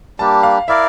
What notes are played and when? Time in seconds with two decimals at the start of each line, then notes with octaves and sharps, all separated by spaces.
0.19 G3 A#3 D4 G4 A5
0.43 F5
0.68 E4 A#4 D5 E5 F5